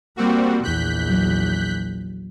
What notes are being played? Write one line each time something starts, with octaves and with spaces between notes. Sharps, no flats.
G3 A#3 C4 F#4
A#1 E2 F#6 G6 B6
F#3